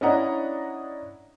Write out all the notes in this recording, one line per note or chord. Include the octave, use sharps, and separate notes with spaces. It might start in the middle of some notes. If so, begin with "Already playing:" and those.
C#4 D4 E4 D#5 F#5 A#5